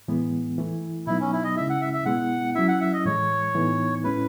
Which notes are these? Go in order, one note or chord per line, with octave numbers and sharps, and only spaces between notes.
A2 E3 G#3 B3
E3 A3 E4
B2 F#3 B3 D#4 E4
C#4
E4
D#5
C#3 G#3 C#4 E4 E5
F#5
E5
E5
B2 G#3 B3 E4 F#5
F#3 C#4 E4 E5
F#5
E5
D#5
A2 E3 G#3 C#5
A2 E3 B3 D#4
A2 G#3 C#4 E4 B4